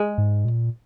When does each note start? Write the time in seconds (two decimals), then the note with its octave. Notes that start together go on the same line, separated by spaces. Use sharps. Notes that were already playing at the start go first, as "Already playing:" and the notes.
Already playing: G#3
0.18 G#2
0.45 A#2